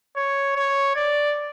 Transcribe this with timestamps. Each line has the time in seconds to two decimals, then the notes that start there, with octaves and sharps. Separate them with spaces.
0.16 C#5
0.56 C#5
0.96 D5